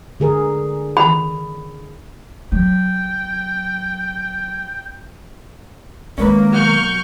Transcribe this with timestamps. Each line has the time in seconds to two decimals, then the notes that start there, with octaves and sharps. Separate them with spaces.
0.20 D3 G#4 A#4
0.97 B5
2.52 F#3 G5
6.18 D#3 G#3 A#3 C#4 B4
6.53 B2 F#3 C#6 F6 G6